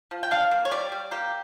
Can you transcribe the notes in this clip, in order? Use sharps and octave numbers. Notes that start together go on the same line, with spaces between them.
F3
G5
D4 F5
A#3
C#5
G3 D5
G3
A#3 G4